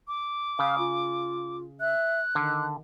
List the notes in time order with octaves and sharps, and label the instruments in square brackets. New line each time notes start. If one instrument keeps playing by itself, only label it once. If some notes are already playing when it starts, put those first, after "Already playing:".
[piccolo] D6
[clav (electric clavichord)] C#3 [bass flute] F5
[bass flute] F4
[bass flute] E5 [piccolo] F#6
[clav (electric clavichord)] D3 [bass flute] D#3